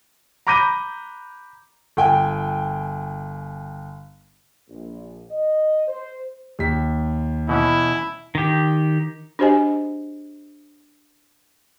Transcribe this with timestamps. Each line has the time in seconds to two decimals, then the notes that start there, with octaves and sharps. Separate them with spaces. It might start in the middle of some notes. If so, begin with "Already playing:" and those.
0.47 A#5 B5 D6 G6 A#6 D#7
1.97 G1 G5 G#5
4.69 A#1
5.31 D#5
5.88 C5
6.59 D#2 B6
7.49 B2 E3 C#4 E4
8.35 D#3 G4
9.39 D4 F#4 G4 C5 D#5 G#5